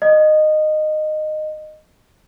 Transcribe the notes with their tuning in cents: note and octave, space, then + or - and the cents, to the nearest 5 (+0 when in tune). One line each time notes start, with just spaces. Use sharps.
D#5 -15